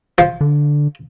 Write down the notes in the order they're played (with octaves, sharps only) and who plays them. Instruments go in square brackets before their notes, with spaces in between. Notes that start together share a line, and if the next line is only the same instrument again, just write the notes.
[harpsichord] F3
[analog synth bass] D3